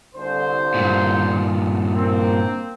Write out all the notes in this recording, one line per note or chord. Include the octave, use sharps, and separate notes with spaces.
C2 D3 C5
G2 A#2
A#3 C4